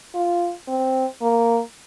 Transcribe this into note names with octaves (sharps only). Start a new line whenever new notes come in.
F4
C4
A#3